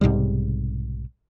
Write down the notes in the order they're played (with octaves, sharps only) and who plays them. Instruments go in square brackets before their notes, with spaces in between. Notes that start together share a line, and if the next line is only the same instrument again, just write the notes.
[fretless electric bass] B1 G#2 C3 G3